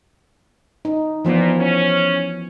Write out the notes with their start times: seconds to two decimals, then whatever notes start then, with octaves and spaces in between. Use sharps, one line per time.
0.85 D#4
1.25 A#2 E3 F3 B3
1.59 C#4